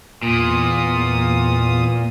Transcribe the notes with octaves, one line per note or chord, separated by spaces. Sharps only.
E2 A#2 A#3 F4 D#6